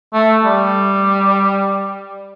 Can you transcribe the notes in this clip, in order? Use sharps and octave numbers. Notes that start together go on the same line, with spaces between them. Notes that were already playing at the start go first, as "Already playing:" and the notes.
A3
G3